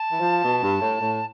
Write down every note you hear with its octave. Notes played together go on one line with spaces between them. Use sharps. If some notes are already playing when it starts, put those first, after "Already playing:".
Already playing: A5
E3
F3
B2
G2
A2
A2